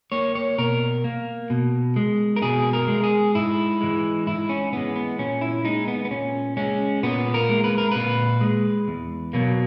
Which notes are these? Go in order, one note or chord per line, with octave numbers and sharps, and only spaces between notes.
A#3 C#5
C#5
B2 A#4
A#3
B2
G#3
A#4
B2 G#4
A#4
G#3
G#4
G#2 E4
E3 G#3
G#2 E4
C#4
E3 G#3 B3
B3
A#2 C#4
E4
G#3 D#4
B3
B3
A#2 C#4
G#3 C#4
A#2 B3
A#4
G#3
B4
A#4
A#2 B4
G#3
E2
B2 F#3 A#3